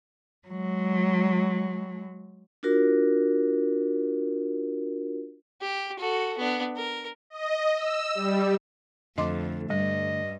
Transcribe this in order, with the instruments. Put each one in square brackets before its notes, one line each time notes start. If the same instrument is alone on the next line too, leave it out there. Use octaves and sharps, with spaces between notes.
[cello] F#3 G#3
[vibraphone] D4 F4 F#4 A#4
[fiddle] G4
F#4 A4
B3 D4
A#4
[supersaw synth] D#5
E6
G3
[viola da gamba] F2 [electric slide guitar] D3 A3 [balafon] D#5 C6 D6
[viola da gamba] G2 [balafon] G3 [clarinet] D#5